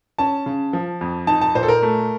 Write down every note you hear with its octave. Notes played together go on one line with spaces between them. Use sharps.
C#4 A5
C#3
F3
F2
D#4 A5
A5
A#2 C5
A4
A#4
A3